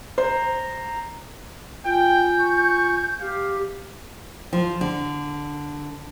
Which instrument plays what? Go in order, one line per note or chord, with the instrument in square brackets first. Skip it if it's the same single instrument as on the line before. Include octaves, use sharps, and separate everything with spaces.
[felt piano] C5 [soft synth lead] A#5
[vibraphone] F4 G#5 [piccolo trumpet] G5 [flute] G6
[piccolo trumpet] C#6
[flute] G4 [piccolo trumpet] F5
[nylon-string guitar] F3
D3